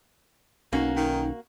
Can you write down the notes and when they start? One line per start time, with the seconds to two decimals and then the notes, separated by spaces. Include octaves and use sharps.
0.73 B1 A#3 C#4 D#4 F#4
0.96 D#3 D#4